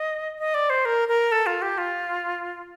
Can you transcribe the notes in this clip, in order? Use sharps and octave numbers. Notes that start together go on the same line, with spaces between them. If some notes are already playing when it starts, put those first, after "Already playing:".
Already playing: D#5
D#5
D5
C5
A#4
A#4
A4
F4
G4
F4